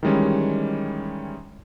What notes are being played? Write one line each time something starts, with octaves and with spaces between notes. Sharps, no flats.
D#3 E3 G3 G#3 C#4